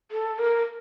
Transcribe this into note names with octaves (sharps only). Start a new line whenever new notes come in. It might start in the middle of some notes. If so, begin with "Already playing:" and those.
A4
A#4